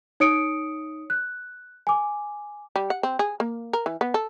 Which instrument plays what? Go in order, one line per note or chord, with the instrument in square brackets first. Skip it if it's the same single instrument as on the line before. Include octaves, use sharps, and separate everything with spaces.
[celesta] D#4 C#5 D#6 C#7 D7
F#6
G#5 D6
[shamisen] G3
F#5
C4
G#4
A#3
A#4
E3
B3
A4